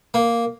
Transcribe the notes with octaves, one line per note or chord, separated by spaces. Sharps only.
A#3